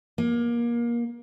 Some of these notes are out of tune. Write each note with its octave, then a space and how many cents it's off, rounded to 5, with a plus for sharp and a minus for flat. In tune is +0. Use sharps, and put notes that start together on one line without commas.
A#3 +25